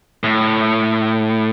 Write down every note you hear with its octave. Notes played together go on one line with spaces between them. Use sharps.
A2